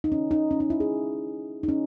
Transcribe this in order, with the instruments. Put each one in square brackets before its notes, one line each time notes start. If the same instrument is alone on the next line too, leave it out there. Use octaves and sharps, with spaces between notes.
[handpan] D#4
C#4
D#4
C#4
D#4
E4
G#4
D#4
C#4